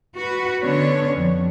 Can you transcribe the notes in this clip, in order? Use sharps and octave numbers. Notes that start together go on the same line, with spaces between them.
F#4 B4
D3 B3 C#4 D4 C#5
F2